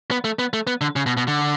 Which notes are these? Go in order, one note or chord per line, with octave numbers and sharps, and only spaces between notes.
B3
A3
B3
A3
B3
D3
C#3
B2
B2
D3